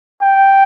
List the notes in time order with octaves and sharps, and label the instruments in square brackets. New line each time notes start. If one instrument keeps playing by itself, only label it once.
[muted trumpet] G5